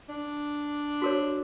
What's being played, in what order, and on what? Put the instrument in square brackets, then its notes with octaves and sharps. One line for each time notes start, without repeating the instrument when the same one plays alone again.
[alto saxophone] D4
[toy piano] F#4 A#4 C#5